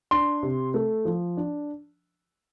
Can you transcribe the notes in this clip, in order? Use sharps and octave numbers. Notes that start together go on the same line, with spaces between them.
D4 C6
C3
A3
F3
D4